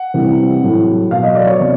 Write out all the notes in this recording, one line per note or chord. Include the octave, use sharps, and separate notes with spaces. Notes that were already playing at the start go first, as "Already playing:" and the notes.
Already playing: F#5
C3 E3 G3
A2 F#3
B2 F#3 F5
D#5
D5
C#5
C3